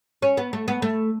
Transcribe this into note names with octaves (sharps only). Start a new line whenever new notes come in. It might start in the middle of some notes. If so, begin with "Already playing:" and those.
C#4
B3
A3
B3
A3